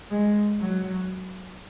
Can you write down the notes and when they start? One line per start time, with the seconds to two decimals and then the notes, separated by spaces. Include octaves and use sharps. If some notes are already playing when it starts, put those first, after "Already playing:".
0.11 G#3
0.59 F#3